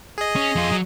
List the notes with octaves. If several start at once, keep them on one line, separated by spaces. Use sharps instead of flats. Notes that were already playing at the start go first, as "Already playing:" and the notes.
G#4 D#5
C#4
F2 F4
F#3